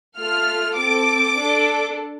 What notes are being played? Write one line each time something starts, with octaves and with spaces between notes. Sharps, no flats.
A3 F4 A4 F6
C4 A4 D6
D4 A4